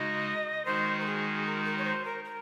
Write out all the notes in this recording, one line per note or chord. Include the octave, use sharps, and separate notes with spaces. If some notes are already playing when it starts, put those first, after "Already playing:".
Already playing: C#3 G#3 D#4 F#4 D#5
D#3 G#3 D#4 F#4 C5
A#4
G#4
A#4
A#4
C#5
C5
A#4
A#4